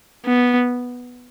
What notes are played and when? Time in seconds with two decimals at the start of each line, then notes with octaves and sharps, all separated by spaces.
0.26 B3